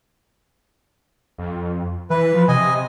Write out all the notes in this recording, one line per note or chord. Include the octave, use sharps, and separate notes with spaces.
F2
E3 B4
F3
C3 D#5 G#5